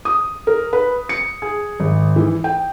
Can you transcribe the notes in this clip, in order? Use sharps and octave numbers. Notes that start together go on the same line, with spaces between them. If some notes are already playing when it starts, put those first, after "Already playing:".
D#6
A#4
B4
C#7
G#4
G#1
E3
G5